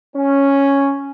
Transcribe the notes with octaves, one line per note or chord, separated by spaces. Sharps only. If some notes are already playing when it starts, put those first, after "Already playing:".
C#4